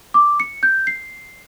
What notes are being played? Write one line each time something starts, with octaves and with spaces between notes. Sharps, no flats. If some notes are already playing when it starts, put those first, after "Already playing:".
D6
C#7
G6
C7